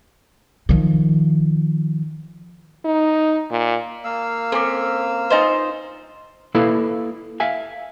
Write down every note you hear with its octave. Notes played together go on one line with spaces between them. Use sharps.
D#3 F3
D#4
A#2
A#3 F5 E6
C4 C#4 A4 G#5 D6
D#4 F4 B4 C5 D#5 G#5
A#3 E4 A4 B4 F5
E5 F5 G#5